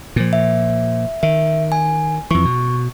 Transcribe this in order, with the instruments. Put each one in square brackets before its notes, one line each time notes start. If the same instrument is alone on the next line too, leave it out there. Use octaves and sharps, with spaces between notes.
[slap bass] A#2 F3
[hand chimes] E5
[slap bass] D#3 [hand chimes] E5
[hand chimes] G#5
[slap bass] F2 E3 [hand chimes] C#6
[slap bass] B2